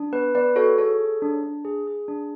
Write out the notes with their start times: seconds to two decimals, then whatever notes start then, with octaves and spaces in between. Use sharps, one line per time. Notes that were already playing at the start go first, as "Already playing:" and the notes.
Already playing: D4
0.12 B3 B4
0.35 B3 B4 D5
0.56 F#4 A4 C#5
0.78 G#4 A4 C#5
1.00 G#4
1.22 D4
1.43 D4
1.65 G#4
1.87 G#4
2.08 D4